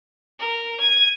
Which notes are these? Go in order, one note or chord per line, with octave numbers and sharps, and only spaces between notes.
A#4
G#6 D#7